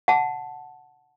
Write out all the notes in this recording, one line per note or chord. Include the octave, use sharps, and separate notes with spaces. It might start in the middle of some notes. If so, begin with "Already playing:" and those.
F#5 A5